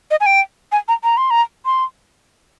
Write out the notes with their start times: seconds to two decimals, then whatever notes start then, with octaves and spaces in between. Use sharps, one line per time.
0.11 D#5
0.21 G#5
0.26 G5
0.72 G#5
0.88 A#5
1.04 A#5
1.17 C6
1.30 A#5
1.65 C6